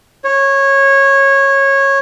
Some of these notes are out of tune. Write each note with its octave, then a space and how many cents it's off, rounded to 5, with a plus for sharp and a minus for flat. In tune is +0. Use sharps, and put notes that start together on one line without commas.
C#5 -15